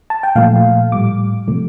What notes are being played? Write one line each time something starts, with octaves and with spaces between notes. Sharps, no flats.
A5
G5
A#2 F3 A3 F5
A2 G3 D6
C3 F3 A3